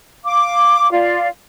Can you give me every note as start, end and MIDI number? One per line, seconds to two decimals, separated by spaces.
0.24 0.90 77
0.24 0.90 86
0.91 1.27 65
0.91 1.27 74